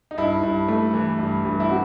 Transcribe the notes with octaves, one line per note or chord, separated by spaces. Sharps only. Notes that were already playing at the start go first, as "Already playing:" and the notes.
D#4
G2 E4
G2
A3
E3
G2
G2
E4
C3 F#4